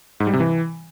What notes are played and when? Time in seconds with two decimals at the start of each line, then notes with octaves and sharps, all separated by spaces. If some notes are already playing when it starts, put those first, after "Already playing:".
0.20 G#2
0.27 G3
0.33 C3
0.40 E3